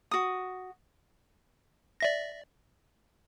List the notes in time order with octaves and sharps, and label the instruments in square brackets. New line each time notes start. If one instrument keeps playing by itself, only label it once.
[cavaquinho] F#4 D#6
[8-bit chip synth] D5 E5 A#6